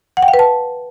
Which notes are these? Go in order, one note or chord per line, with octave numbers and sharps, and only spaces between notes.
F#5
G5
F5
B4
A5